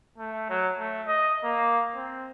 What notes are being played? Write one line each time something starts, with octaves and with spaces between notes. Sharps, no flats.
A3
F#3
A3
D#5
A#3
C4